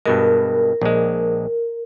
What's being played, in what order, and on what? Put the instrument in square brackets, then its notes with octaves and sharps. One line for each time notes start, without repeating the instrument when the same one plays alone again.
[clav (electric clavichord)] G2 B2 G#3 [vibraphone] A#4
[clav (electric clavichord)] A#1 G#3